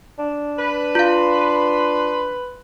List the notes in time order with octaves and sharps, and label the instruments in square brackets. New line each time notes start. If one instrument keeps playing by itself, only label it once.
[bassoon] D4
[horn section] B4
[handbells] F4 F5 [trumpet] C6